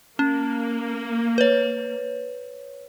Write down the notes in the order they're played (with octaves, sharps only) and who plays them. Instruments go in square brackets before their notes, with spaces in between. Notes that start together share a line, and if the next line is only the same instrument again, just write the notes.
[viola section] A#3 [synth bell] C#4
[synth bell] B4 C#5